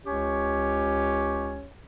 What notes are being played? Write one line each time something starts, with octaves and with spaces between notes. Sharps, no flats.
C#2 C#4 G4 C#5